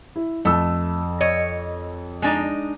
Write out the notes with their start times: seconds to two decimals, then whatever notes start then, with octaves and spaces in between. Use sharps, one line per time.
0.16 E4
0.45 F2 A3 E6
1.21 C#5 D#5
2.22 G#3 D4 D#4